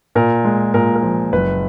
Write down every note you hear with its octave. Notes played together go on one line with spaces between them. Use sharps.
A#2 A#4
G#3
A#2 A#4
A#4
F3
F#1 B4